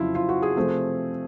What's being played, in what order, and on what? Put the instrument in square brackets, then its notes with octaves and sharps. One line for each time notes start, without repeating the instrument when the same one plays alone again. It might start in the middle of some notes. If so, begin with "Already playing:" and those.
Already playing: [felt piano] F2 C#3 F#3 E4 F4
F4
F#4
G#4
C3 F3 A3 C4